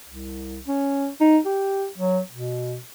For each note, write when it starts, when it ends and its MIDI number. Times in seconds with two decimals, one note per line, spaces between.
0.05 0.62 36
0.67 1.08 61
1.21 1.38 63
1.46 1.86 67
1.98 2.20 54
2.31 2.77 47